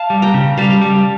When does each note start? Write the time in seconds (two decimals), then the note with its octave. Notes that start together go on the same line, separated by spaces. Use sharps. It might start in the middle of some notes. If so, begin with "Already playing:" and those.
Already playing: F5 A5
0.10 G3
0.22 G5 A#5
0.34 C#3
0.57 G3 F5 A5
0.82 G3